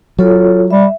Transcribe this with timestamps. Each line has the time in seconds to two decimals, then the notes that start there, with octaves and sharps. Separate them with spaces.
0.19 F#3 F4 A4 C#5
0.71 G3 E5